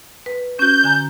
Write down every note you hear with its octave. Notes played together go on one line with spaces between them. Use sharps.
B4
C#4 F#4 G6
D3 G#5 A#5